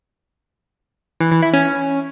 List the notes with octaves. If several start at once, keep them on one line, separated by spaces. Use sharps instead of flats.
E3
E3
E4
C#4